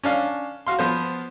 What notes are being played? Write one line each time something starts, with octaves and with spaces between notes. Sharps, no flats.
C#4 D4 F5
F#4 F5 C6
F3 B3 C5